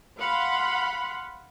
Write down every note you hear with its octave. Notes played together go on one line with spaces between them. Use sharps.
F5 F#5 B5 C6